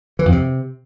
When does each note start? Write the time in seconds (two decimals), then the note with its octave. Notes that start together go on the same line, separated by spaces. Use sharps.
0.19 E3
0.26 F2
0.32 C3